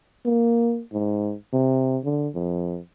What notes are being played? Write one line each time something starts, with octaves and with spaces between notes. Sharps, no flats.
A#3
G#2
C3
D3
F2